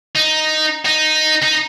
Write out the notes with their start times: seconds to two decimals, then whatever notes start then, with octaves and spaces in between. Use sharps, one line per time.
0.15 D#4
0.86 D#4
1.43 D#4